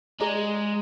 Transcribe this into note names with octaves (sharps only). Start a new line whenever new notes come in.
G#3 G#4 D5 A#5